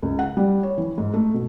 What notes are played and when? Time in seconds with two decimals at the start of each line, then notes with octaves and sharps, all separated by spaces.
0.02 C#2
0.19 F#5
0.37 G3
0.63 C#5
0.78 E3
0.98 G#2
1.14 A3
1.34 B2